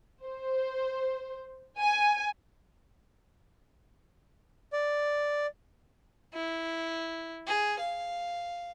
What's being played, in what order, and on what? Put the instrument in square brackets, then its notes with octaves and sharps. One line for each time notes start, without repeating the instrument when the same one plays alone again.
[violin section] C5
G#5
[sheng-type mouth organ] D5
[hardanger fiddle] E4
G#4
F5